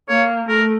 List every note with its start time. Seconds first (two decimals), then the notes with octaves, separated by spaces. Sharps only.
0.09 A#3 C#5
0.49 A3 A#4